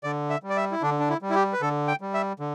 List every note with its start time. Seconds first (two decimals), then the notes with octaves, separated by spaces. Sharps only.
0.04 D3 D5
0.30 E5
0.44 G3
0.50 D5
0.57 E5
0.72 E4
0.82 D3 D4
1.00 D4
1.09 E4
1.22 G3
1.30 E4
1.36 G4
1.53 B4
1.61 D3 A4
1.88 G5
2.01 G3
2.14 E5
2.40 D3